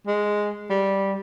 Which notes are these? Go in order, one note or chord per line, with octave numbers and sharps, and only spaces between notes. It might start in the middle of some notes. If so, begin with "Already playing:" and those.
G#3
G3